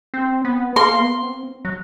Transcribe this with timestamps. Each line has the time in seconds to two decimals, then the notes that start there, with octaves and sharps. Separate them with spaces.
0.14 C4
0.45 B3
0.76 A#3 C6
0.99 B3
1.22 C4
1.65 F#3